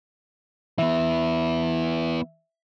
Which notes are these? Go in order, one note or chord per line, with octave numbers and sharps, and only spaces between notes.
E3 B3 E5